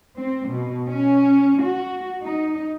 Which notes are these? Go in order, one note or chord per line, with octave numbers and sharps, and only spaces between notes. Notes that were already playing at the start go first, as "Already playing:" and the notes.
C4
B2
C#4
F#4
D#4